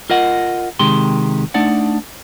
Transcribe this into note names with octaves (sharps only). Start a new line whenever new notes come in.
F4 A#4 D#5 F#5
C3 D#3 G#3 G4 C6
A3 D4 D#4 D5 F#5